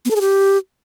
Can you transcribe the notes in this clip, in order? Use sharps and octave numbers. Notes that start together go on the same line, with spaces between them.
B3
A4
G#4
G4